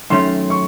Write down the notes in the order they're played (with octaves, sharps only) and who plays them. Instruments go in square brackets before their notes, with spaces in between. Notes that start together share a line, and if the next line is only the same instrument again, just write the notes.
[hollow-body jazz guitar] F#2 D#3 A3 C#4 [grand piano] C6
[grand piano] C#6